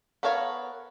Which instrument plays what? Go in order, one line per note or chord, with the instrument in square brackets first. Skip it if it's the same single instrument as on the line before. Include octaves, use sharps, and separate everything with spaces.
[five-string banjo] B3 A4 A#4 C#5 F5